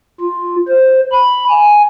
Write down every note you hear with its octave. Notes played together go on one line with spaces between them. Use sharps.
F4
C5
B5
G#5